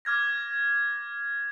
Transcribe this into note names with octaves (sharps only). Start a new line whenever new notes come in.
D6 F6 G#6 A#6